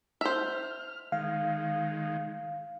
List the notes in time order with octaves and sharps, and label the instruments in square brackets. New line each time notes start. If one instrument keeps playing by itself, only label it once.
[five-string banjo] C5 E5 [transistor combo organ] F6
[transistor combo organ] D#3 G#3 [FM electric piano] F5